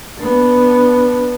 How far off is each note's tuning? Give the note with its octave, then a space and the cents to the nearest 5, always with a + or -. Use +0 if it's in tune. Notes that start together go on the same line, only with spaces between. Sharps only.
B3 -5 D4 +0